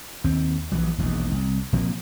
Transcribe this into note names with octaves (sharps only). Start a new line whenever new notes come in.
D#2 C4
A#1 E3 F#3
E1 A#1 D#2
C2
A#2 F3 A#3 C4